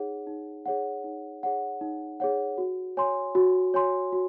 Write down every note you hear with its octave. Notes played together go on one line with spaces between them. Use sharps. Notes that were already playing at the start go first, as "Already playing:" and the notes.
Already playing: D#4 G#4 C#5 F#5
D#4
G#4 C#5 F#5
D#4
G#4 C#5 F#5
D#4
G#4 C#5 F#5
F#4
C#5 G#5 C6
F#4
C#5 G#5 C6
F#4